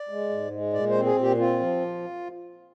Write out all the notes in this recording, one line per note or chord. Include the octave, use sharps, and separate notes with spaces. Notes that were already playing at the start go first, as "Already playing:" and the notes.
Already playing: D5
G#3
G#2
G#3
A#2 D5
C5
C4
G#4
A#2 G4
C4 F4
F3